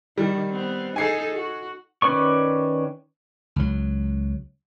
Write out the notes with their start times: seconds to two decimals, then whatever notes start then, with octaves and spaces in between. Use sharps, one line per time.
0.18 D#3 G3
0.49 B3 C4
0.96 D#4 G#4 A4 G#5 C7
1.35 F#4
2.02 D#3 C#4 B4 D5 C#6
3.56 C#2 F#3